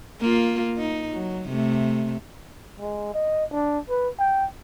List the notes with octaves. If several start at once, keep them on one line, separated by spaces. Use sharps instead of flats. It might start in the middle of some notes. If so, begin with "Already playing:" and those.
A#3 F4
D#4
F#3
C3 A3
G#3
D#5
D4
B4
G5